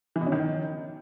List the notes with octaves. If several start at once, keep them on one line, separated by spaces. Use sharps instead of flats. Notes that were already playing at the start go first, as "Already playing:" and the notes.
E3
B2
C#4
D#3